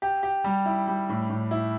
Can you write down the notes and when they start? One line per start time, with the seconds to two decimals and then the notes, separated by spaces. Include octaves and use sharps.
0.02 G4
0.23 G4
0.44 G3
0.66 E4
0.87 G3
1.09 A2
1.29 A2
1.51 E4